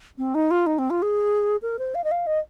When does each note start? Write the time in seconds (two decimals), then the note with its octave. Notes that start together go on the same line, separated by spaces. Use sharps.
0.18 C4
0.35 D#4
0.51 F4
0.66 D#4
0.79 C4
0.90 F4
1.02 G#4
1.62 A#4
1.79 C5
1.95 F5
2.04 D#5
2.11 F5
2.27 D#5